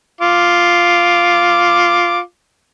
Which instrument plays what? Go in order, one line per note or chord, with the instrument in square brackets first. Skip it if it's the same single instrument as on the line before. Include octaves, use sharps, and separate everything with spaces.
[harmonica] F4 D6